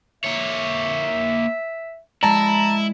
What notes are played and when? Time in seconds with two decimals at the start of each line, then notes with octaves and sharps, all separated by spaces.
0.24 A#3 C#5 E5
2.23 G#3 E4 D5 A5 A#5